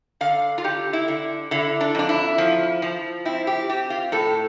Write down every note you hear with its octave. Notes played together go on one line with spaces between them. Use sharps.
D3 F5
F4
D3 G4
E4
D3
D3 E4
D4
F2 D4
E4
F3
F3
C4 E4
G4
C4 G4
F4
A2 A4